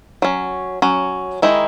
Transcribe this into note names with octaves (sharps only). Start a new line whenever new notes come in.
F#3 C#4
F#3 C#4
D#3 G#3 D#4 E4